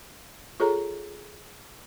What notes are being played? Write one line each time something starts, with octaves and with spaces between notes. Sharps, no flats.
F4 G#4 A4 C#5 A#5